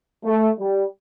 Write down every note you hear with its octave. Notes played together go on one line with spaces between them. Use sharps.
A3
G3